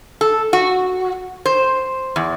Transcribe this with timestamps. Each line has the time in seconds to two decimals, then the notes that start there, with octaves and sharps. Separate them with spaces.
0.21 A4
0.53 F#4
1.46 C5
2.16 E2